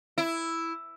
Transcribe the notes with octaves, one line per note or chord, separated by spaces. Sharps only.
E4